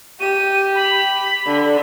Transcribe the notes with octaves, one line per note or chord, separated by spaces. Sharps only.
G4 D#7
B5
D3